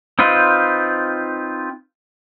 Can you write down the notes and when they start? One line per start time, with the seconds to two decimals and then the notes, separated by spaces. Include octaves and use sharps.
0.19 C4 D#4 F4 B4